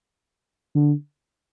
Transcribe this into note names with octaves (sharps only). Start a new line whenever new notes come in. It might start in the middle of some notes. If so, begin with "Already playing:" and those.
D3